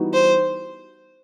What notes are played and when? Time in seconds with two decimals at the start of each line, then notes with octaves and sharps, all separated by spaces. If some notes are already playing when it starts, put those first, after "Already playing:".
Already playing: E3 G3 B3 D#4 F#4
0.13 C5